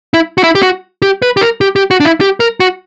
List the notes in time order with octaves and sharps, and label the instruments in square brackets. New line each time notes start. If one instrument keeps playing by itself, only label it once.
[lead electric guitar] E4
F#4
E4
G4
F#4
G4
B4
G4
A#4
G4
G4
F#4
D4
E4
G4
A#4
F#4